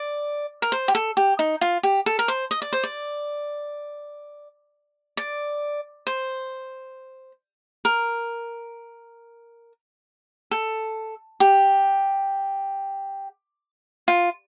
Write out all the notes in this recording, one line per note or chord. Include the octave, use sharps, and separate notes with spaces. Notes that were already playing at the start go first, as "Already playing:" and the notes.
Already playing: D5
A#4
C5
G4
A4
G4
D#4
F4
G4
A4
A#4
C5
D#5
D5
C5
D5
D5
C5
A#4
A4
G4
F4